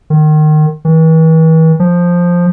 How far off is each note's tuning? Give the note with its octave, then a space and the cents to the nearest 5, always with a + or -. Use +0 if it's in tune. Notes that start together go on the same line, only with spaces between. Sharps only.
D#3 -25
E3 -40
F3 +5